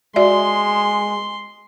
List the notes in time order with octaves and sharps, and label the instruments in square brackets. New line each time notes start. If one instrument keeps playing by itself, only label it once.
[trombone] G#3 [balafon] F#4 D5 E5 [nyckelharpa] C6